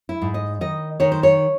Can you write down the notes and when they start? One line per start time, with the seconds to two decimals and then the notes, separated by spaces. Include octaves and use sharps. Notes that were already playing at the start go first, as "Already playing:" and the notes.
0.09 E4
0.22 G#2
0.34 D#5
0.61 D#3 D#5
1.00 D#3 C#5
1.12 C5
1.23 C#5